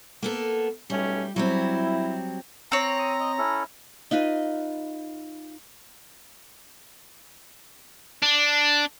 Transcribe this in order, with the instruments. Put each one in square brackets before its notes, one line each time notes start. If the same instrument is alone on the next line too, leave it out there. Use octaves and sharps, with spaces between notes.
[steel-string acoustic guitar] A#3 B3 A4
[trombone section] B1 A3 C#4 [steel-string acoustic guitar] G3
[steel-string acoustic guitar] F#3 G3 C4 [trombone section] E4
[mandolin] C4 C#5 [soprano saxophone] A#5
[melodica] D#6
D#5
C#4 E4 A4
[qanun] D#4 F4 B4 D#5
[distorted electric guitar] D4